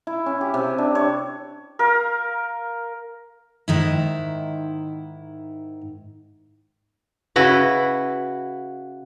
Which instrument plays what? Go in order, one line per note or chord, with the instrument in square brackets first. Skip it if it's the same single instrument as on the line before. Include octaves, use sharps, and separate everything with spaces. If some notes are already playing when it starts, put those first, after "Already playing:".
[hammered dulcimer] E4
C#4
G4
C3
D4
C#5
[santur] A#4 F5
[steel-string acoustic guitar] G#2 D#3 E4
[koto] C#3 E4 F#4 B4